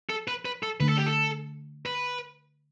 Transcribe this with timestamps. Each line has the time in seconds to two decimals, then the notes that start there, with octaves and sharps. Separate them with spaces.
0.10 A4
0.28 B4
0.45 B4
0.63 A4
0.80 D3 A3 D4 B4
0.89 A4
0.98 G4
1.06 A4
1.86 B4